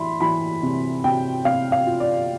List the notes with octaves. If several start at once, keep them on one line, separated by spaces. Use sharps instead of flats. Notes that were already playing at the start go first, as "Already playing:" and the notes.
Already playing: E3 E5 B5 C6
E3 B5
C3
C3 G5
C3 F5
F5
F4
D5